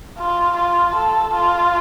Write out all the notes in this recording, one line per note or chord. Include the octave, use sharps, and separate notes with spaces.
F4
F4
A4
F4